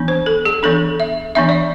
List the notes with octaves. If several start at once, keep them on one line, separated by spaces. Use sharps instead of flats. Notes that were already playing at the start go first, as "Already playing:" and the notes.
Already playing: E3 B3 D4
C5
A4
G#4
E3 B3 D4 A4
E5
E3 B3 D4 E5
D5